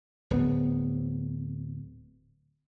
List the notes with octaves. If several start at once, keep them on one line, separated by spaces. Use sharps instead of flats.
D1 B3